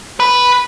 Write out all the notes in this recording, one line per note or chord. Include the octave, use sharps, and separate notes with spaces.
B4